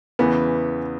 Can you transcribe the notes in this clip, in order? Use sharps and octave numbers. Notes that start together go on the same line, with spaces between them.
E2 C#3 E3 B3